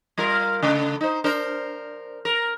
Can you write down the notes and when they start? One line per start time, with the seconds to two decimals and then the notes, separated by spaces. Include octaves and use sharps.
0.18 G3 F4 A#4
0.62 C#3 A3
1.01 D#4 C5
1.24 D4 A#4 C5
2.25 A#4